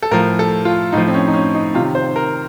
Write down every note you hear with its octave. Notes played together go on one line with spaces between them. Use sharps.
A4
A2 F3 A#4
A4
F4
A2 F3 D#4
C4
C#4
D#4
C#4
D#4
C3 F4
D#3
C5
A#4